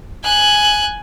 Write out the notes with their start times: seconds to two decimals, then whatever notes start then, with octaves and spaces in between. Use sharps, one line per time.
0.24 G#5 F#6